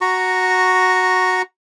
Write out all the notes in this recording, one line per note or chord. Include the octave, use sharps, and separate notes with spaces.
F#4 A#5 C#6